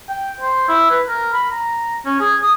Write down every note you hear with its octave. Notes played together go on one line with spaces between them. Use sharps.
G5
C5
E4
B4
A#4
B5
A#5
C#4
G#4
D#6